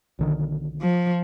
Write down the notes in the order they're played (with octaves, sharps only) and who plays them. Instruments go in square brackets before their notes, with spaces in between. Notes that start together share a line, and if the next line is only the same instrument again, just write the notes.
[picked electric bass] B1 D3 D#3
[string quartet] F3